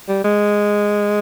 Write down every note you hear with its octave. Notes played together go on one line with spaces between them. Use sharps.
G3
G#3